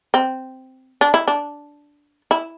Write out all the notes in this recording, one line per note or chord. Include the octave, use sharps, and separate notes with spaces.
C4
D4
E4
D4
E4